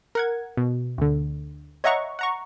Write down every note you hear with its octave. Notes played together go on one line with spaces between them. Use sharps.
A#4 F#5 G#6
B2
D2 D3
C#5 D#5 E5 F#5 A#5 C#6
F#5 A#5 C#6